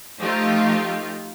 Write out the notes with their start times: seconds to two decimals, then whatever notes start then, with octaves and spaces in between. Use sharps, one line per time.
0.18 F3 A3 D#4 F4 G4